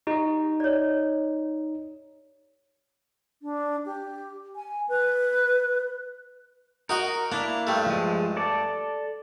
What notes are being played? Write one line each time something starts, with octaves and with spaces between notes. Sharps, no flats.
D#4 G4 D#5
C#5 D5
D4
G4
G#5
B4
D#4 F#4 A#4 D#5
A#3 D4 E4 F5
G2 A3
F3 G#3
A4 D5 A5